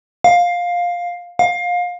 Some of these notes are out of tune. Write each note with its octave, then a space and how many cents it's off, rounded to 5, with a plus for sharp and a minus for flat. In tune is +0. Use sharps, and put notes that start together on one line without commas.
F5 +10
F5 +20